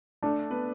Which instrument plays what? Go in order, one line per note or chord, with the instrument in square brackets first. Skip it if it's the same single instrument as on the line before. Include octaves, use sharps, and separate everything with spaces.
[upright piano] A3 A4 [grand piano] D4
[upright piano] B3 B4